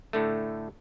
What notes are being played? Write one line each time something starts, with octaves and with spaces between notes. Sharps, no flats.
A2 D3 A3